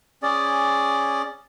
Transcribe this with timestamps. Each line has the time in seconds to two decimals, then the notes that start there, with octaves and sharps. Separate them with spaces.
0.23 C#4 G#4 D5